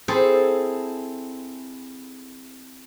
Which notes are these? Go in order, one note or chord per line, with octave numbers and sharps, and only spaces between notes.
C4 E4 G#4 A4 C5